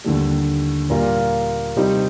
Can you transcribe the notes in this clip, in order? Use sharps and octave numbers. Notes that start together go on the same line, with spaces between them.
D#2 D3 G3
A#2 G3 A#3 F4 A#4
C3 G3 C4 D#4 G4